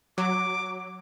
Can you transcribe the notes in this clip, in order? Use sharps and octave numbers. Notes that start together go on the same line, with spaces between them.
F#3 D6